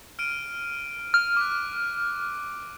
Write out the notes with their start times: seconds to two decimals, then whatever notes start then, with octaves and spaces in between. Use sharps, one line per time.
0.19 F6 D7 D#7
1.14 F6
1.37 D6 F#6